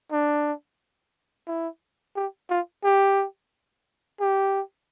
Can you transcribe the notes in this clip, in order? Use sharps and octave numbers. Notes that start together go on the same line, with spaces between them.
D4
E4
G4
F4
G4
G4